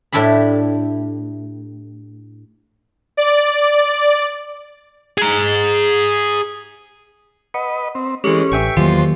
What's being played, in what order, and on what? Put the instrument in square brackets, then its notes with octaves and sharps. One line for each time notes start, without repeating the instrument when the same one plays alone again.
[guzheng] A2 D4 E4 G4 B5
[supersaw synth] D5
[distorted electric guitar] G#4 A#5
[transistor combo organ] B4 D#5 [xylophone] F#5
[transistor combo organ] C4
[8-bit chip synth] E3 G#3 [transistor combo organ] C#4 [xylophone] G4 A4 C#7
[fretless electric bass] A1 [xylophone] B4 G#5 E6 [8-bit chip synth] E5 G5 C#6
[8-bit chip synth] E2 F4 [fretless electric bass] D#3 F#3 A#3 [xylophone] G4 [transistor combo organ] C5